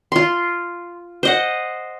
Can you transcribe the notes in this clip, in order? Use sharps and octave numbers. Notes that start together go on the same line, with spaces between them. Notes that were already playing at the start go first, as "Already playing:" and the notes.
F4 C6
C5 D#5 F#5